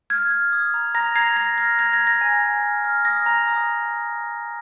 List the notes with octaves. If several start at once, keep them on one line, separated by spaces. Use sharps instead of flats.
F6 G#6
F6
D#6
A#5
A#5 A#6
A#5 G#6 C7
A#5 A#6
F6 A#6
A#5 G#6
A#6
A#5
A#6
G#5
G#5
F6
F6
D#6 A#6
A#5
D#6